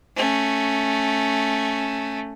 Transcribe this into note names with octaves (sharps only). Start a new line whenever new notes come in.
A3 C#4